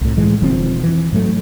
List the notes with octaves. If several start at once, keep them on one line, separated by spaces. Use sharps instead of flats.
C2 A2
A2 E3 G#3
E1 D#3 F3 C4
E3
G#2 F#3 A3